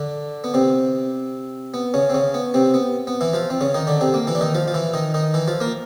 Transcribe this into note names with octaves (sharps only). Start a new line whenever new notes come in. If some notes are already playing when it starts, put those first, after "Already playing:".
Already playing: D3 D4
B3
C3 C4
B3
C#3 C#4
C4
C#3 C#4
B3
C3 C4
B3
B3
E3 E4
F3 F4
C4
C#3 C#4
D#3 D#4
D3 D4
C3 C4
A#3
E3 E4
D4
D#3 D#4
F3 F4
F4
E3 E4
D#3 D#4
D#3 D#4
E3 E4
F3 F4
A#3 A#4